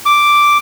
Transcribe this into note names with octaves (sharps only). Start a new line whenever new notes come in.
D6